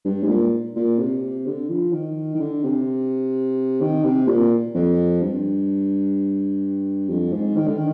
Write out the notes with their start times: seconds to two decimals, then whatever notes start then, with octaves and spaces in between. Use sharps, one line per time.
0.05 G2
0.23 G#2
0.28 A#2
0.76 A#2
0.99 C3
1.46 D3
1.69 F3
1.93 D#3
2.35 D#3
2.39 D3
2.63 C3
3.81 D#3
4.04 C3
4.28 A#2
4.74 F2
5.22 G2
7.09 F2
7.33 G#2
7.56 D#3
7.67 D3
7.77 D#3